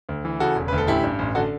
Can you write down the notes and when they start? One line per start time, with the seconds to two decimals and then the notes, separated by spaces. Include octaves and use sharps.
0.09 D2
0.25 E3
0.40 C#3 F#4 A4
0.56 E1
0.68 D2 B4
0.78 A4
0.87 A1 E4 G4
1.04 G2
1.19 A1
1.35 D3 F#4 A4